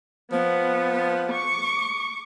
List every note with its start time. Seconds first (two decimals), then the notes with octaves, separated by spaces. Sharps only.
0.32 F3 B3
1.30 C#6 D6